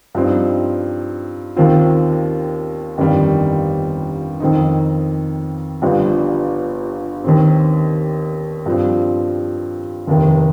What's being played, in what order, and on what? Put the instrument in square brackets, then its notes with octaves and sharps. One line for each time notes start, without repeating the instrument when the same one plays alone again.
[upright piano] G2 F3 C4 D#4
D#2 D#3 C4 F4
G1 F2 D#3 G3
F2 D#3 C4 D#4
G1 G2 F3
D#2 D#3 C4
G2 F3 C4
F1 D#2 D#3